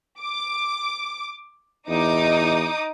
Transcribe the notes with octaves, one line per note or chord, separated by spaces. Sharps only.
D6
E2 D#4 D6 D#6